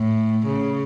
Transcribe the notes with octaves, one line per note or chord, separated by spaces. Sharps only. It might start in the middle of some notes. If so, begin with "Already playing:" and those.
Already playing: A2
C#3